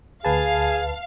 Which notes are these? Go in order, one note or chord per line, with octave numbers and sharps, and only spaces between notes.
D2 G#4 B4 F5 A5